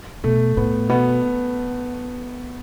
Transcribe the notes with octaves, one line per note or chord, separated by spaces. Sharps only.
B2 A3
A2 B3
B2 B3